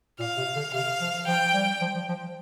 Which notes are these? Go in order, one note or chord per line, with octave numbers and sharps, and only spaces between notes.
A#2 F5
C3
D3
C3 F5
F3
F3 G5
G3
F3
F3
F3